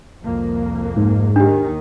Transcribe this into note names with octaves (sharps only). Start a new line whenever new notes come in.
C2 F2 A#3
G#2
D#2 D#3 D4 G4